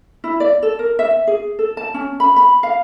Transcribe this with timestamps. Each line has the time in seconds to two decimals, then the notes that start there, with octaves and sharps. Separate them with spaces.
0.24 E4
0.40 D5
0.62 A4
0.79 A#4
0.99 E5
1.27 G#4
1.59 A4
1.77 A5
1.94 C#4
2.20 B5
2.36 B5
2.63 F5